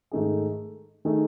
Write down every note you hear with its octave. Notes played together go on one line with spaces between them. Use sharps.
G#2 D#3 A3 D#4 G#4
D#3 A3 D#4 G#4